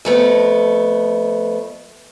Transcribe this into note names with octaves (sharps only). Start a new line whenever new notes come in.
F2 A3 B3